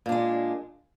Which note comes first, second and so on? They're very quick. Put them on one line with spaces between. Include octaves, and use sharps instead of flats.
A#2 D4 G#3